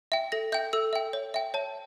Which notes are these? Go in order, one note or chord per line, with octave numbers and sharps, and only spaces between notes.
E5 G5
A4 A#6
E5 G5 G6
A4 E6
E5 G5
C#5
E5 G5
C#5 A5